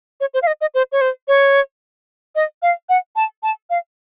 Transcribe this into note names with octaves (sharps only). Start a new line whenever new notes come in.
C#5
C5
F5
D#5
D#5
C5
C#5
C5
C#5
D#5
F5
F#5
A5
A5
F5